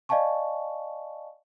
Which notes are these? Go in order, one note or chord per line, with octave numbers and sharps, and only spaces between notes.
D5 D#5 F5 G#5 A5 C#6